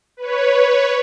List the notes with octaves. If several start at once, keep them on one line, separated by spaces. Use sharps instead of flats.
B4 C#5